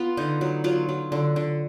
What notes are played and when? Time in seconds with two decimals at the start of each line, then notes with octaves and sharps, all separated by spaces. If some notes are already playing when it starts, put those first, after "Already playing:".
Already playing: B3 F4
0.17 D3 D#4
0.41 F#3
0.64 F#3 F4
0.89 F#3
1.12 D3
1.36 D3